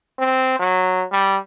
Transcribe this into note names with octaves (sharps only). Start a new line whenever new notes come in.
C4
F#3
G3